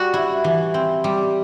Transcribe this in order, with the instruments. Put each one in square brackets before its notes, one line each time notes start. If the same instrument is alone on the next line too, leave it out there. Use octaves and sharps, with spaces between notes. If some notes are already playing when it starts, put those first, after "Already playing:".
Already playing: [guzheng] G3 [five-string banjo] F#4
[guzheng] E4
E3
C4
G3